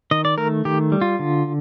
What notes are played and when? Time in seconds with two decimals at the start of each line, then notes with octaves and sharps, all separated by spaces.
0.11 D#3 D#5
0.25 D5
0.38 A3 A#4
0.65 D#3 G4
0.92 G3
1.01 F4
1.19 D3